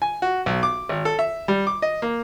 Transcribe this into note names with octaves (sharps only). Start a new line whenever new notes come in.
G#5
F#4
B1
D6
G#1
A4
E5
G3
D6
D#5
A#3